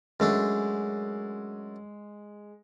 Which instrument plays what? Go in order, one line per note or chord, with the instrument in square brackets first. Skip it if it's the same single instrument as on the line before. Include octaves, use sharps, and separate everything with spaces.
[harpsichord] F#2 A3 D4 [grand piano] G#3